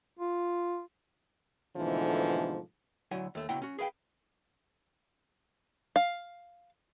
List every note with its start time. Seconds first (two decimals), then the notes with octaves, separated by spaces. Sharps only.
0.19 F4
1.76 G#2 B2 D3 E3 F3 A3
3.11 D2 F#3 E4 F#5 G#5
3.35 D#2 A3
3.49 C#2 B2 E4 F#5 G5 A#5
3.62 C#4 F#4
3.79 G#4 B4 F5 G5
5.96 F5